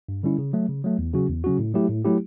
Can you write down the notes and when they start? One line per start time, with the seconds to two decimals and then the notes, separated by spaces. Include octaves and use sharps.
0.09 G2
0.23 D3 G3 C#4 E4
0.39 C#3
0.53 F#3 A3
0.69 C#3
0.84 F#3 A3
0.99 E2
1.14 C#3 F#3 C#4 F#4
1.29 E2
1.44 C#3 F#3 C#4 F#4
1.59 A2
1.74 F#3 A3 E4 G4
1.89 A2
2.05 F#3 A3 E4 G4